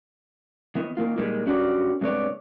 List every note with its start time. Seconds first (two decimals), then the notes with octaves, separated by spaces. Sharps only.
0.75 D#3 B3
0.97 D#3 A#3 F4
1.17 A#2 D#3 G3 G#3
1.46 G2 C#4 F#4 G4 D5
2.01 G2 C3 G#3 B3 C#5 D5